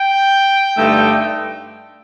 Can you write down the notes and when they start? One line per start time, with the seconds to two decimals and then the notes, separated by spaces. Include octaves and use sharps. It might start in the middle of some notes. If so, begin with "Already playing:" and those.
Already playing: G5
0.76 G2 D3 A3 D#4